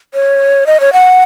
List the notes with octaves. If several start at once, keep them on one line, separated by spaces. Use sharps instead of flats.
C#5
D#5
C#5
F#5